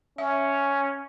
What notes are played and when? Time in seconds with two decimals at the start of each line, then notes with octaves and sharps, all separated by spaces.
0.18 C#4 E5